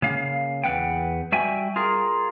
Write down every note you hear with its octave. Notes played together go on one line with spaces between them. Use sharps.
C#3 A#3 F5
E2 A#3 B4 F#5 G5
G3 F#4 E5 G5 G#5
F4 G#4 A#4